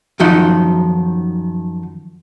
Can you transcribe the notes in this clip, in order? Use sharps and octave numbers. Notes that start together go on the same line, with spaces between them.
F#2 D#3 F3 D#4 F#5 C6